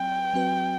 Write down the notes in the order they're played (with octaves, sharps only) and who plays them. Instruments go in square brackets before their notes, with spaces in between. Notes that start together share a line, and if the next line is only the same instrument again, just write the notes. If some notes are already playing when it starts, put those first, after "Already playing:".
Already playing: [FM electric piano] F#3 C4 B4 [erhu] G5
[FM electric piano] F#3 C4 F#4 B4